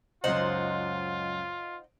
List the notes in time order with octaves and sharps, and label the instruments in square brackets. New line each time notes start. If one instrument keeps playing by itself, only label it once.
[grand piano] C#2 F#2 [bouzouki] D#4 C5 F#5 [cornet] F4